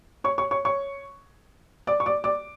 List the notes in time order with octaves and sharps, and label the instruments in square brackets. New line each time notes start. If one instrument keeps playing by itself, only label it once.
[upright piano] C#5 C#6
C#5 C#6
C#5 C#6
C#5 C#6
D5 D6
C#6
D5 D6
D5 D6